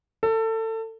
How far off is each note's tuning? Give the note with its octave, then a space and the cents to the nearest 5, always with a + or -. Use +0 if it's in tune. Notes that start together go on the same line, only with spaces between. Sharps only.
A4 +25